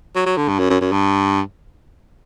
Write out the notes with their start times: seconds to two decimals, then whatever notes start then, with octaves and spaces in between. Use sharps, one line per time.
0.15 F#3
0.26 F#3
0.37 D3
0.48 G2
0.59 F#2
0.70 F#2
0.81 F#2
0.92 G2